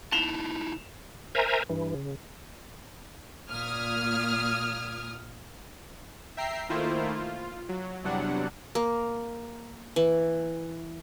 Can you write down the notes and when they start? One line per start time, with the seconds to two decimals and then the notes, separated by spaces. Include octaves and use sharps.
0.12 D#4 E4 A5 E7 F7 G7
1.35 A#4 C5 E5 G#5 A#5
1.69 G2 E3
1.94 C#3
3.51 A#2 D#6 F6 G#6
6.37 E5 G5 A#5 C7
6.69 D#3 A3 A#3 E4 F4 C5
7.16 F4
7.69 F#3
8.04 E2 C3 F#3 G3 D4 F#5
8.75 A#3
9.96 E3